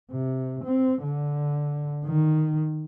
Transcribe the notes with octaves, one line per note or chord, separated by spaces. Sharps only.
C3
C4
D3
D#3